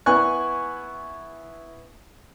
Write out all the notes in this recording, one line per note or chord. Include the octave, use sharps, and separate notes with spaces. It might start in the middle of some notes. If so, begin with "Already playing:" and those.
B3 E4 G#5 C#6 F#6